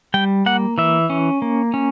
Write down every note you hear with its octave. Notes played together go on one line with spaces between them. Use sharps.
G3 G5
A#3 F#5
E3 E5
C#4
A#3
C#4